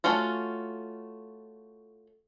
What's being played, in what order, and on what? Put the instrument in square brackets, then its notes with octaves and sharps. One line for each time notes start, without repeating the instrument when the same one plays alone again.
[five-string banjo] A3 C#4 F4 F#4